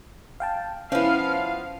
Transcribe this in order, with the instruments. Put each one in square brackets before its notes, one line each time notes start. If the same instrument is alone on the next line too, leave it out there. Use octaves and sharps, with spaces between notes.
[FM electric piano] F5 G5 A5
[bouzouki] F3 B3 [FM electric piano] C#4 E4 [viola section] F5